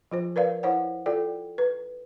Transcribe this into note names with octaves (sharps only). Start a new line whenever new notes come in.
F3 F4 C5
A#4 B4 D5 F5
E4 C5 C#5 F#5
F4 A4 D5 G5
B4